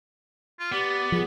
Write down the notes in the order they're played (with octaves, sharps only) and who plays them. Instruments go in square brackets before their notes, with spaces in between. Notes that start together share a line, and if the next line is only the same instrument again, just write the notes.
[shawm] F4
[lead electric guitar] B3 [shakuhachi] G4 [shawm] D5
[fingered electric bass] F3 [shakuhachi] G#4